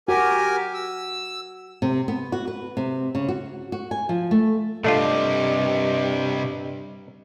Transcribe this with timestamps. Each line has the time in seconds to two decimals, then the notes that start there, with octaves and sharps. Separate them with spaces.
0.08 F#4 G4 A#4 G#5
0.74 E6
1.82 C3
2.08 B3
2.32 F#4
2.47 B4
2.77 C3
3.15 C#3
3.29 F#4
3.72 F#4
3.91 G#5
4.09 F3
4.31 A3
4.84 G2 C3 G3 A3 D4 F4 D#5